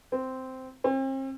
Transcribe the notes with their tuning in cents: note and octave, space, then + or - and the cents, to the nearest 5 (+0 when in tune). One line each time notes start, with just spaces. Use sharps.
C4 -10
C4 +40